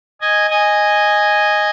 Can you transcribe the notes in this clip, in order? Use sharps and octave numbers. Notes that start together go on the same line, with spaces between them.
D#5 G#5
D#5 G#5